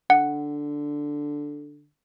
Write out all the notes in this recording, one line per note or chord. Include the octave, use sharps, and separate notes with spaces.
D3 F#5